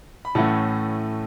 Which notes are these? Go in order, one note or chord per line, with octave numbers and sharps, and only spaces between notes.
B5
A2 E3 A3 C#4 F#5 A5